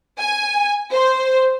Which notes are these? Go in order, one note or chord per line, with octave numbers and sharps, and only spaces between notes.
G#5
C5